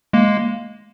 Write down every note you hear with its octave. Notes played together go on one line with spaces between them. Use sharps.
G#3 A#3